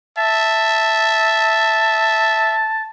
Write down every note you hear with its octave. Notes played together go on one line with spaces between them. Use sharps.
E5 A5